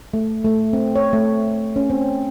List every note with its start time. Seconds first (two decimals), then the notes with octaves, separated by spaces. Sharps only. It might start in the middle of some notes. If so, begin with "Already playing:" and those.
0.14 A3
0.45 A3
0.73 C4
0.95 C#5
1.13 A3
1.76 C#4
1.90 C4